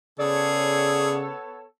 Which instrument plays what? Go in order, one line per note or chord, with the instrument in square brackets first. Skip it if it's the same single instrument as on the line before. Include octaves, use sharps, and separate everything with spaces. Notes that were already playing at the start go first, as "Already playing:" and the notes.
[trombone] C#3 [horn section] B3 A4 C#5 [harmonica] G#4 [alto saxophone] D5